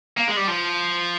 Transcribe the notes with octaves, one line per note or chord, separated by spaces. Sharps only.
A#3
G#3
G3
F3